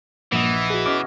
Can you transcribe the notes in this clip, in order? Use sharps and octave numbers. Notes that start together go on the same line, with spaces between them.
A#1 G2 E3 A#3 D#5 E5 F#5
E6
F#4 G#4
B2 C#4 D6